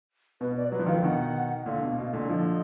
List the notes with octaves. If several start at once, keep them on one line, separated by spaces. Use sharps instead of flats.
B2 B4
D5
F#3 B4
F3
D#3 F5
D3 F3
B2 D#3 F#5
A#2 D3 F5
B2
B2
A#2 D3
D3 F3 D#5